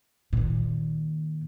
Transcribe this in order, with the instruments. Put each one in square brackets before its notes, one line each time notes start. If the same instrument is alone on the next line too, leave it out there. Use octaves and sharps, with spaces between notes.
[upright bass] A#2 D#3